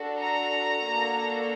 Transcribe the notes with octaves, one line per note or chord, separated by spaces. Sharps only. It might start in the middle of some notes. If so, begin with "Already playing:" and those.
Already playing: D4 F#4 A4
A#5
A#3 D4 F#4 A4